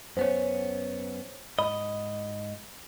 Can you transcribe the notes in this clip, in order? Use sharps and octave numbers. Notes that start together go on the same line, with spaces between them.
F#2 B3 C#4 C5 C#5
G#2 D#5 B5